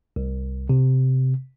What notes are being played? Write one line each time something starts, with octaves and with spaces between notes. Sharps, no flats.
C2
C3